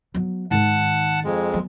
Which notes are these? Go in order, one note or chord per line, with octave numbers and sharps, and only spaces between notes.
F#3 B3
G#2 D#3 F#5 A5
F2 G#3
F#3 B3